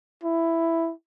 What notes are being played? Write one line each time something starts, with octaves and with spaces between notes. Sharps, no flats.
E4